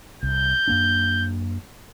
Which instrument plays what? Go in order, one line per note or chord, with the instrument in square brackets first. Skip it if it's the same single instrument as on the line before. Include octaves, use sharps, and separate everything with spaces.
[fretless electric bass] C2 [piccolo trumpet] G6
[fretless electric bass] F#2 A#3 D4